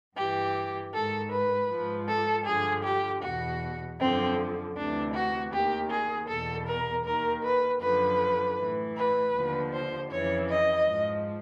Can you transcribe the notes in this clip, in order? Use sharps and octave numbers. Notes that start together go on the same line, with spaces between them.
G2 E3 G4
G#2 D#3 A4
B4
G#2 F3
A4
G2 D3 F3 G#4
G4
E2 B2 F#4
F#2 D3 F3 C4
D2 C3 E3 D4
F#4
D#2 D#3 G4
G#4
E2 B2 A4
A#4
D#2 D#3 A#4
B4
F#2 D3 F3 B4
A2 E3
B4
D#2 D3 F3
C5
F2 C#3 E3 C#5
D#5
G#2 F3